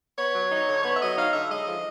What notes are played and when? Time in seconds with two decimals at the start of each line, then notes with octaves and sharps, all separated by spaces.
0.18 B3 C#5
0.35 F#3
0.50 D#4
0.68 D3
0.83 B3 C#5
0.95 E5
1.00 F#3 D#5
1.17 D#4 F5
1.33 D3 E5
1.49 G#3 D#5
1.66 F3